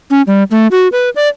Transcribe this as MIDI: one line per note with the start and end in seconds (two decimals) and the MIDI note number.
0.10 0.22 61
0.27 0.43 55
0.51 0.67 57
0.71 0.88 66
0.92 1.10 71
1.16 1.28 74